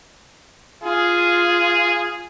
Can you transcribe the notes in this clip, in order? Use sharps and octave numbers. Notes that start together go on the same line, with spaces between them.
F4 G#4